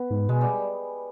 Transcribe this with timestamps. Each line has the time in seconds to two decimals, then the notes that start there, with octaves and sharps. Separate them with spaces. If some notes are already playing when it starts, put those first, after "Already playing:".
Already playing: B3
0.11 G#2
0.29 B2 G#3
0.41 G3